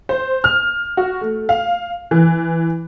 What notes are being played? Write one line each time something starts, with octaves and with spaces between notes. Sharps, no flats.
C5
F6
F#4
A3
F5
E3